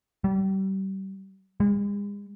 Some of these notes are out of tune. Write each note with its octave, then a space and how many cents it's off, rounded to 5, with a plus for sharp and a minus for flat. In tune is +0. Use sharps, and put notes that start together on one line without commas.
G3 -30
G#3 -40